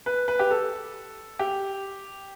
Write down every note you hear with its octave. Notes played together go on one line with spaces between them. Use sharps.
B4
B4
G4
A4
G4